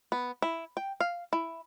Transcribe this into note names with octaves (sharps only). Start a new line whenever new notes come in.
B3
E4
G5
F5
E4